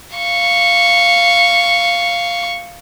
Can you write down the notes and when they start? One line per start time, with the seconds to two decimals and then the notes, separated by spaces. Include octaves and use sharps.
0.16 F5 C#6